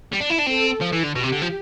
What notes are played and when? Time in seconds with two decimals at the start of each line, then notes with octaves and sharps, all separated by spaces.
0.13 G3
0.21 D4
0.30 E4
0.39 D4
0.47 C4 A4
0.82 F3
0.93 E3
1.04 D3
1.15 B2 G4
1.24 C3
1.32 D3
1.42 F3